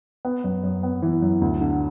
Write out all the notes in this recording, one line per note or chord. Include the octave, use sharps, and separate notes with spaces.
B3
F#2
F#2
B3
E3
F#2
D2
D3